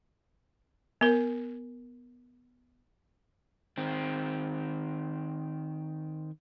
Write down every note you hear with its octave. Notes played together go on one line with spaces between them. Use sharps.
B3 A#4
D#3 C4